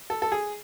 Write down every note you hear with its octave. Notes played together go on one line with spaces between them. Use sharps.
A4
A4
G#4